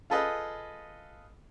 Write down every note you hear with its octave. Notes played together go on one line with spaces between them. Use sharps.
F4 G#4 A4 B4 D#5 F5